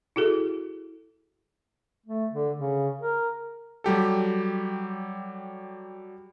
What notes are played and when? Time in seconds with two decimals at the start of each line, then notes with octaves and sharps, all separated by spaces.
0.16 E4 F#4 G#4 A4
2.06 A3
2.32 D3
2.57 C#3
3.01 A#4
3.84 F#3 G3 G4 A4